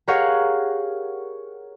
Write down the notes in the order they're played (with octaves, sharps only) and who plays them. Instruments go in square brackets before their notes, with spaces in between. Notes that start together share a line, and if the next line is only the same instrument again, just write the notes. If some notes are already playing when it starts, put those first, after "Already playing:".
[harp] G4 G#4 A#4 C#5 F5 F#5